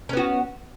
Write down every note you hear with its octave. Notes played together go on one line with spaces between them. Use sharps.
B3 C#4 F#4